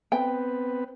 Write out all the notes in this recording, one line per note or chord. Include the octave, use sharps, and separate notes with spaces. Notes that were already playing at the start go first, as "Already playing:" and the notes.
B3 C4 B4 G5